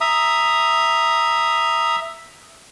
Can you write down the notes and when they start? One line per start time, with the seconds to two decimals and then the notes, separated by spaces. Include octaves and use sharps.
0.01 E5 A#5 D#6